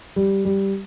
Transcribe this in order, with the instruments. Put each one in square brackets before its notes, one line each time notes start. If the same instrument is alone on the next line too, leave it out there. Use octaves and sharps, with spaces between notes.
[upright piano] G3
G3